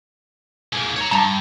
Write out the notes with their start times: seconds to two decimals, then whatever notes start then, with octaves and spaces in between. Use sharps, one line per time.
0.72 G#2 A#3
0.96 C#5 A#5
1.11 G2 A5 A#5